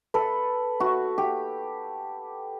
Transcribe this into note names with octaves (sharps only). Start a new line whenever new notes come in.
A4 B4
F#4
G4